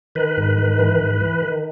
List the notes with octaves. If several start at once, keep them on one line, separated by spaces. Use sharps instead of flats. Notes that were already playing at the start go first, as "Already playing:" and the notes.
D#3 B4
G#2
D#3
E3
G#2
E3
D#3